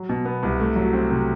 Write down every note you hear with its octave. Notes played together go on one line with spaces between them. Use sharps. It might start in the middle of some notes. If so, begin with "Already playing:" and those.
Already playing: F#3
B2
B3
C2
A3
F#3
C4
C3